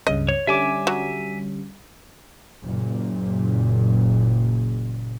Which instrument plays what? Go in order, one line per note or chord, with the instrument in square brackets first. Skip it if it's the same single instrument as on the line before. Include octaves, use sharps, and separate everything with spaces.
[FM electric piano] C#2 G2 C#3 [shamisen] D#5
[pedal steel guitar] C#5
[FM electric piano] D3 G3 C#4 [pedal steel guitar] E5 G#5 D6
[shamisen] F#3
[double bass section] F#1 A#2